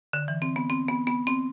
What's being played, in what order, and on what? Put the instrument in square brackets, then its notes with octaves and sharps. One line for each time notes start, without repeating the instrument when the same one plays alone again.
[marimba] D3
E3
C4
B3
C4
B3
B3
C4